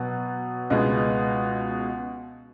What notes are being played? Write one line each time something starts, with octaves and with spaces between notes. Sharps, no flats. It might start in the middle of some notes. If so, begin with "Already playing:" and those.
Already playing: B2 F#3 B3
C#2 B2 G#3 B3 D#5